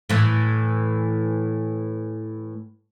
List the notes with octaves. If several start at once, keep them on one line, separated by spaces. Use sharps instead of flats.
A2 E3